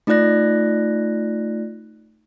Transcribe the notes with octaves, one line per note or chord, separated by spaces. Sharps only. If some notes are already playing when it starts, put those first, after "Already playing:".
A3 D#4 F4 D5 F#6 A#6